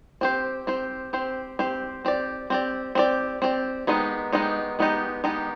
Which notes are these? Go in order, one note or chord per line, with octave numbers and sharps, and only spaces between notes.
C4 G4 C5
C4 G4 C5
C4 G4 C5
C4 G4 C5
C4 G4 D5
C4 G4 D5
C4 G4 D5
C4 G4 D5
D#3 G#3 B3 D#4 G4
D#3 G#3 B3 D#4 G4
D#3 G#3 B3 D#4 G4
D#3 G#3 B3 D#4 G4